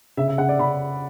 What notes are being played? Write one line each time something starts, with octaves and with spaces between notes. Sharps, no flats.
C#3 E5
E5
C#3 F#5
D5
C#3 B5